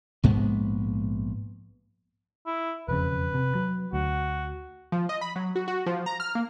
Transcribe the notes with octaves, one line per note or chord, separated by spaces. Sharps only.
A#1 G#2 G#3 B3
E4
E1 F2 C#3 B4
C3
F#3
D2 F#4
F3
D#5
B5
F#3
F#4
F#4
F3
A#5
F6
A#3